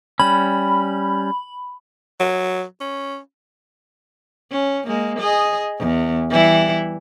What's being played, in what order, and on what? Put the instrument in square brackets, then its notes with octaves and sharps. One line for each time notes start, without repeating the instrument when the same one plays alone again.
[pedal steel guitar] G3 C#4 [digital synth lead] B5
[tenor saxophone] F#3
C#4
[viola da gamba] C#4
G#3 A#3
G#4 D#5
E2
E3 G3 E4